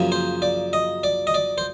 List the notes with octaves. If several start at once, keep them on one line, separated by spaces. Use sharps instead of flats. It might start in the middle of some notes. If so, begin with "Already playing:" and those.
Already playing: F#2 C#3 F3 A#3
C5
D5
D#5
D5
D#5
D5
C5